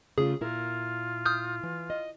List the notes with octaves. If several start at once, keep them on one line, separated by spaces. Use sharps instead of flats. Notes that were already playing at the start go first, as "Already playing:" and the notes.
C#3 A3 F4 G#4
A#2 E4 F4 A#4
D#6 F6 G6
E3
D#5